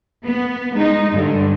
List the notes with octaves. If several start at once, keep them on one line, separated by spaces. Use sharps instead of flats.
B3
G#3 D#4
G2 D3